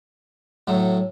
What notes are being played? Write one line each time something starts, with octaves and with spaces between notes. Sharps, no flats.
A2 F#3 A3